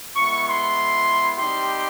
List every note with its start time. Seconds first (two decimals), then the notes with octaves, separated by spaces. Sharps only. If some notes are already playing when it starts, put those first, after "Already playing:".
0.16 G#3 B3 E4 C#6
0.47 C6
1.39 G3 C4 D#4 G4 C6